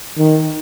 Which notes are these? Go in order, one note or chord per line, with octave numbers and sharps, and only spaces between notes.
D#3